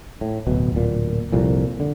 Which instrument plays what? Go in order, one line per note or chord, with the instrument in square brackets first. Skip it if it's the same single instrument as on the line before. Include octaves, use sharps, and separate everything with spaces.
[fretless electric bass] A2
D1 B2
D1 A#2
C2 F2 A#2
D3